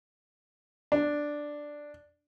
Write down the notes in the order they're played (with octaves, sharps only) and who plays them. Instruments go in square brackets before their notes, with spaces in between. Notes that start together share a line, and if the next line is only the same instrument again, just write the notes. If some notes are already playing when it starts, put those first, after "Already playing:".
[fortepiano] D4